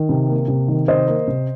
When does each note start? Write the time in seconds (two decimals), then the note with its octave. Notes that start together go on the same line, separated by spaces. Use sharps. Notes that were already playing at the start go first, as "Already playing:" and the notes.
Already playing: D#3
0.09 C3
0.29 A#3
0.48 C3
0.68 D#3
0.88 C3 C5 D#5
1.08 A#3
1.28 C3